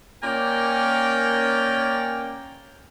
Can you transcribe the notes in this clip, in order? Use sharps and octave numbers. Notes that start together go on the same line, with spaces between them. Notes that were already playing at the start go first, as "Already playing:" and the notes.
A#3 C#4 A#4 D5 G5